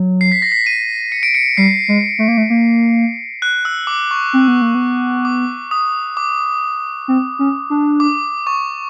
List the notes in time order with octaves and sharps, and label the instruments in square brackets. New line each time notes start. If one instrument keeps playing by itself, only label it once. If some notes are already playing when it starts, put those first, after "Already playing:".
Already playing: [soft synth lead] F#3
[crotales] C7
B6
A#6
B6
D#7
C#7
D7
C#7
[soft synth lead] G3 [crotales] C7
[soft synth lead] G#3
A3
A#3
A3
A#3
[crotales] F#6
E6
D6
C#6
[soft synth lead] C4
B3
A#3
B3
[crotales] D6
D#6
D6
[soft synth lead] C4
C#4
D4
[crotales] D6
C#6